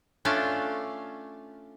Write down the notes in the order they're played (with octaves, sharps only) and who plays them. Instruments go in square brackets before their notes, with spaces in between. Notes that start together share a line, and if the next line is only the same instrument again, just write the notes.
[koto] A3 C#4 D4 F4 D5 F5